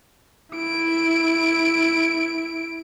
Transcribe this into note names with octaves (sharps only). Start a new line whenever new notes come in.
E4 D7